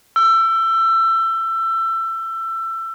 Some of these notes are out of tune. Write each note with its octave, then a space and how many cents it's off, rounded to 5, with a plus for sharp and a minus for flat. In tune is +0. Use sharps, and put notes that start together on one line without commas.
E6 +25